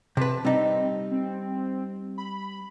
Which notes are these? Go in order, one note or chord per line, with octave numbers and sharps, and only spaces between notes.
C3 B4 A5
G3 C4 D#4
C4
B5